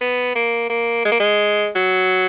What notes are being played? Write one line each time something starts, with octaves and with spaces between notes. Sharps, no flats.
B3
A#3
A#3
G#3
A#3
G#3
F#3